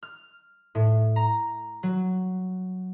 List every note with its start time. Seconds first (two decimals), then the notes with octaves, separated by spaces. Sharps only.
0.03 F6
0.75 A2
1.16 A#5
1.83 F#3